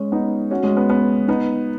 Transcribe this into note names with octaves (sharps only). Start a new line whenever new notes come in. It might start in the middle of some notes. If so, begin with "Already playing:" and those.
Already playing: G#3 C#4
B3 D#4
C#4 F#4
G#3 C#4
B3
B3
B3 D#4